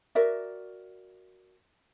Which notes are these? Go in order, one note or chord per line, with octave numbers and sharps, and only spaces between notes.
F#4 A#4 D5 E5